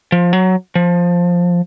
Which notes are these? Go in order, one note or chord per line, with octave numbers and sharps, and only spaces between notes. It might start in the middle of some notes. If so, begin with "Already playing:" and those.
F3
F#3
F3